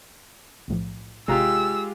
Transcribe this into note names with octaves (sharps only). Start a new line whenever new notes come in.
B1 A2 F3
G#1 C3 G#3 F4 G4 A#5 E6